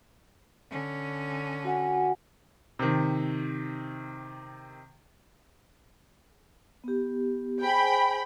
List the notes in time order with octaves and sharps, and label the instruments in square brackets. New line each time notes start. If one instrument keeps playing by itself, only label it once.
[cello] D3 C#4
[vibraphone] F#4 F#5 G#5
[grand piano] C3 D#3
[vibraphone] B3 G4
[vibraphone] G#4 C5 G#5 [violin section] G5 B5